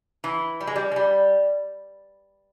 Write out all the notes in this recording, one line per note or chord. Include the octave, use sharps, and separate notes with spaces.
E3
G3
G#3
G3
G#3
G3